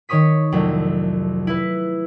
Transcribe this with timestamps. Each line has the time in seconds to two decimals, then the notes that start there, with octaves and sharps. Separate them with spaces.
0.09 D#3 C#5 C#6 D#6 B6
0.52 C2 F2 F#3 A3
1.47 E4 B4